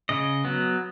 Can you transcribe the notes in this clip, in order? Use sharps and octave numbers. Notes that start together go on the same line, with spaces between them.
C#3 D#5
F#3 B3